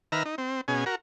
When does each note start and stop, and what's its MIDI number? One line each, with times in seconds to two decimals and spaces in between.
0.12 0.23 51
0.12 0.23 71
0.12 0.23 76
0.12 0.23 82
0.12 0.23 89
0.25 0.35 63
0.38 0.61 60
0.68 0.85 47
0.68 0.85 61
0.68 0.85 68
0.86 0.95 66
0.86 0.95 70